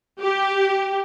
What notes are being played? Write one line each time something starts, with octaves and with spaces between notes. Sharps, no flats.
G4